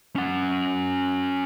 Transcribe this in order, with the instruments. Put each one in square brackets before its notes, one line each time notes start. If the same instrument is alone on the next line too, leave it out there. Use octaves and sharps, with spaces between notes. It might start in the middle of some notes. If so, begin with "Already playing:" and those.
[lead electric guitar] C#4 F#5